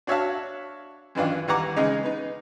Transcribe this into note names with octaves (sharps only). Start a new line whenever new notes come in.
D4 F#4 C#5 E5 F5 A5
F#2 D#3 E3 D4 F4
D#2 E3 G3 F#5 A#5 D6
C#3 G#3 D#4
B3 D#4